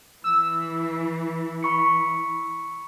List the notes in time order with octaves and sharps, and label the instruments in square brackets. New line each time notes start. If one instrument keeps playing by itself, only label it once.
[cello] E3 [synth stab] E6
[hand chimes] B5 C#6 C#7